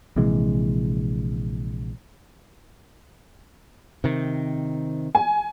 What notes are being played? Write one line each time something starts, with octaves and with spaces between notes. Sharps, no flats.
A#1 C3 E3 G#3
C3 D#3
G#5